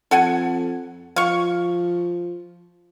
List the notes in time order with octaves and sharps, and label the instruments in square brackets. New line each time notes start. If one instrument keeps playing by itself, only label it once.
[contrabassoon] F2 [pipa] A4 F#5 G#5
[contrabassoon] F3 [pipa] F5 C#6